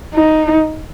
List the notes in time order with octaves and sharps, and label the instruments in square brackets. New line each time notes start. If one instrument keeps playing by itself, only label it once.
[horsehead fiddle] D#4